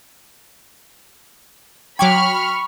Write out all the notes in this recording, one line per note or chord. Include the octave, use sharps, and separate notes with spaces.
F#3 G5 B5 C#6 D6 F6 G#6